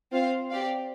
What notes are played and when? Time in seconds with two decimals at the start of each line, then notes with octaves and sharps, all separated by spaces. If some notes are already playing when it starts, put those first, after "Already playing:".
0.12 C4 F4 C5 F5
0.50 C4 G4 D5 F5